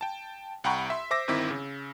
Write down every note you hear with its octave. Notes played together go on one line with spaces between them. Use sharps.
G5 A5
C2 F#5 G5 A#5 B5 C#6
E5 C6
C5 E5 D6 E6 A#6
G1 D#3 C4 E4 D6 B6
C#3